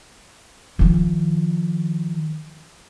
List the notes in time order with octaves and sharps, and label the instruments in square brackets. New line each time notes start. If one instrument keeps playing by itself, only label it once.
[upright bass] D#3 F3